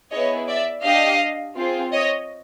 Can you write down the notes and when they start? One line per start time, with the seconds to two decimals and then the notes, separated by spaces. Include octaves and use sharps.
0.11 B3 E4 G#4 C#5 D#5
0.48 D5 E5
0.83 D4 G4 D#5 F5
1.56 C4 F4 G#4
1.91 C#5 D#5